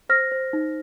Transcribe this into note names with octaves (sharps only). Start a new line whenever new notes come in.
C5 F6 A#6
C5
D#4